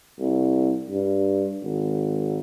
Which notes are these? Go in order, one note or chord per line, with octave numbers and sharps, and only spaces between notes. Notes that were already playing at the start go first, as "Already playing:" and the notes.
C2
G2
G#1